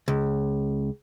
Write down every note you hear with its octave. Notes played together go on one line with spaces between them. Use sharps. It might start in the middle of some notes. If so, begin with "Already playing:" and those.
C#2